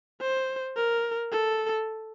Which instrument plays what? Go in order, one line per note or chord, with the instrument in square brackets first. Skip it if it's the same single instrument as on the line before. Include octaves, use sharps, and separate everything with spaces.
[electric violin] C5
A#4
A4